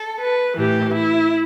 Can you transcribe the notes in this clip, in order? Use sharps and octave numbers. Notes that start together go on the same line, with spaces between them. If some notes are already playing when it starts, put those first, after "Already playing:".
Already playing: A4
B4
A2 E3 G4
E4